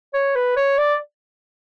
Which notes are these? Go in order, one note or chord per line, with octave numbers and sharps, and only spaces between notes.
C#5
B4
C#5
D5